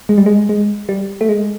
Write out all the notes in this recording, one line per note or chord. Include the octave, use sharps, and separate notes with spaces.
G#3
G3
G#3
G#3
G3
A3
G#3